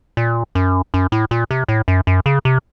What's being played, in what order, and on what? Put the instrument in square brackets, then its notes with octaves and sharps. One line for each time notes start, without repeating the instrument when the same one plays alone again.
[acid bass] A#2
F#2
F#2
A2
A#2
C3
A2
F#2
F#2
C#3
C3